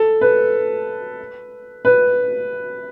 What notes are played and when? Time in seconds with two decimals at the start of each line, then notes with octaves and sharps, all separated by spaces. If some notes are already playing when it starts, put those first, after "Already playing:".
Already playing: A4
0.21 B4
1.85 B4